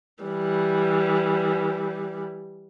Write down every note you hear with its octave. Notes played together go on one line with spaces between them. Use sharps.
E3 G3